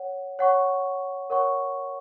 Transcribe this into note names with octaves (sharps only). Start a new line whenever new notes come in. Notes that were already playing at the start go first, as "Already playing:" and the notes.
Already playing: C#5 F#5
C#5 F#5 C#6
A#4 C#5 F#5 C#6